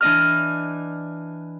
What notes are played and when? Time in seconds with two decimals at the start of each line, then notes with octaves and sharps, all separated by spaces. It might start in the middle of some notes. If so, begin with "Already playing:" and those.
0.01 E3 D4 D#5 F6